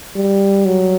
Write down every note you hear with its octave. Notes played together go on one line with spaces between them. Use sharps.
G3
F#3